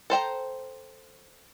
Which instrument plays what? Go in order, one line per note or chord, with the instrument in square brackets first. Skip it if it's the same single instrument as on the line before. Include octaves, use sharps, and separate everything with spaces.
[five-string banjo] A4 C5 G5 A#5